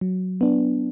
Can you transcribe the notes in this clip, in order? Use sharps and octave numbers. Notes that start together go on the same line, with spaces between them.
F#3
B3 D4